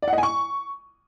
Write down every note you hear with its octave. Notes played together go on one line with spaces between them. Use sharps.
D5
F#5
D#5
G#5
C#6